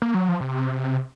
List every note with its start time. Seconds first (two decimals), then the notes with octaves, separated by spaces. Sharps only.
0.02 A#3
0.14 F#3
0.29 F3
0.41 C3